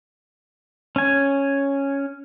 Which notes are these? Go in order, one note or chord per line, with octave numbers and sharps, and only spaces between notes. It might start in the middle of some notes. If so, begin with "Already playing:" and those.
C#4 G#5